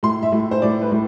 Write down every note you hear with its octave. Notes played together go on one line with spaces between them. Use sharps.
A2 C6
E5
A2
C5
A2 D5
B4
A2